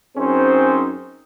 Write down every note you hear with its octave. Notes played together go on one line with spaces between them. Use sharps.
F#2 C4 C#4 D#4 G#4 C5